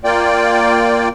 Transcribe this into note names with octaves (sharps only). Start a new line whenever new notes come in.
A#3 F4 D5 G5